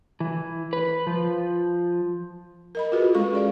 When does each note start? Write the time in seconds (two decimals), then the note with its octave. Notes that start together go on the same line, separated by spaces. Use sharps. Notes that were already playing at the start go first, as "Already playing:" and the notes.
0.20 E3
0.73 B4
1.07 F3
2.75 A#4 D#5 B5
2.92 F4 F#4 G#4 A4 B4 D#5
3.15 G#3 C#4 A4 C#6
3.33 G#4 D5 F5